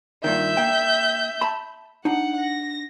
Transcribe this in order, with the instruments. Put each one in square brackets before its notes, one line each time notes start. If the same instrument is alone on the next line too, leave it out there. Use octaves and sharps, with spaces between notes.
[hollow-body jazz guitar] G2 A#2 D#3 [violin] E5 G6
[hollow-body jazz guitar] A#3 G5
A5 B5
[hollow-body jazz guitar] D4 D#4 [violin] F#5
[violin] A#6